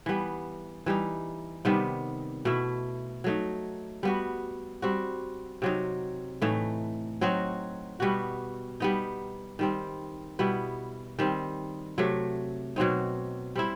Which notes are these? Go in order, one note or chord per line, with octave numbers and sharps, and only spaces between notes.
E3 G3 B3
E3 G3 D#4
C3 D#3 G3 B3
B2 A3 E4
F#3 A3 D#4
G3 B3 F#4
G3 C4 F#4
C3 F#3 C4 D#4
A2 E3 A3 D#4
F#3 C4 D#4 F#4
B2 G3 B3 F#4
G3 B3 D#4
D#3 G3 C4
B2 G3 B3 E4
D#3 G3 C4
C3 F#3 A3
B2 F#3 C4 D#4
G3 C4 E4